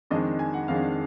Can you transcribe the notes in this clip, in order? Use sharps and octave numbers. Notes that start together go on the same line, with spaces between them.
F2 D#3 G#3 D4 D#5
G#5
F#5
F2 D#3 G#3 D4 F5